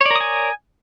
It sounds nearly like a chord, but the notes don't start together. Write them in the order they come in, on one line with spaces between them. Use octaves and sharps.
C#5 D5 A#4 D#6 G#5